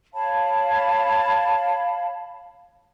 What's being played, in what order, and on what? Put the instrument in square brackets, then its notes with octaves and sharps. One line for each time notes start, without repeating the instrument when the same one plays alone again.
[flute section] C#5 F5 A5 B5